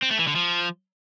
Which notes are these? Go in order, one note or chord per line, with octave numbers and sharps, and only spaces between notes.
C4
A3
E3
D3
F3